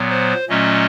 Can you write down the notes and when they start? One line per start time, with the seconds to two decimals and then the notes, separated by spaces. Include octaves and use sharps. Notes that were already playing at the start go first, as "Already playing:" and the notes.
Already playing: A#2 F#3 B3
0.10 C5
0.49 A#2 F#3 A3 C#4 D#5